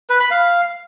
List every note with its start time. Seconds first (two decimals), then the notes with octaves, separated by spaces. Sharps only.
0.09 B4
0.20 B5
0.31 F5